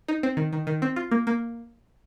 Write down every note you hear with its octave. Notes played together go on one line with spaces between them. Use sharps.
D#4
C4
D#3
D#3
D#3
C4
F4
A#3
A#3